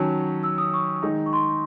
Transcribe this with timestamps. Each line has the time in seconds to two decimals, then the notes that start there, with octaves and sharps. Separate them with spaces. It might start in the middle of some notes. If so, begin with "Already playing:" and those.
Already playing: D#3 F#3 C#4 A5
0.43 E6
0.58 D#6
0.74 C#6
1.03 D#3 G#3 D#4
1.26 C#6
1.33 C6